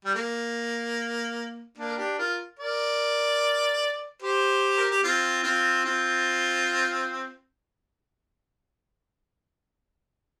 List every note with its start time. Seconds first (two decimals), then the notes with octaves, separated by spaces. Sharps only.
0.05 G3
0.15 A#3
1.77 A#3 D4
1.89 A#4
1.98 D4 G4
2.18 F4 A#4
2.59 A#4 D5
4.22 G4 C5
4.78 A#4
4.91 G4
5.04 C4 F4
5.44 C4 F4
5.85 C4 F4